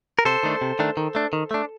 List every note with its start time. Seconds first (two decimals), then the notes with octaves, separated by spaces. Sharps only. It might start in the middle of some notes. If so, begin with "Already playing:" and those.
0.19 A#4
0.25 C3 A4 C5
0.43 D#3 A3 D4
0.61 C3
0.79 D#3 A3 D4
0.97 D#3
1.15 A3 D4
1.33 D#3
1.51 A3 D4